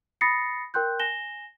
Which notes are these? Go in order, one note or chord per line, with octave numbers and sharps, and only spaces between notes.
B5 D#6 A6 A#6 C7 C#7
A#4 G5 C6 F#6 G6
G#5 A#6 E7 G7